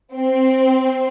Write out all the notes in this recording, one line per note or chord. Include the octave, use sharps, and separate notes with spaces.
C4